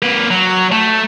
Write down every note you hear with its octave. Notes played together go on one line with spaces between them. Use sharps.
A#3 B4
F#3
A3